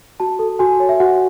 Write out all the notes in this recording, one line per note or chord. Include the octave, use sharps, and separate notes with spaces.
F#4 A5
A4
F#4 G#5
C#5
E5
F#4 F#5